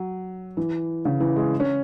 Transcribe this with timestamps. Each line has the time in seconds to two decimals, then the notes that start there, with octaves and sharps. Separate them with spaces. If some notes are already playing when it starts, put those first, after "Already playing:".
Already playing: F#3
0.57 E3
1.05 C#3
1.20 E3
1.36 G#3
1.60 C#4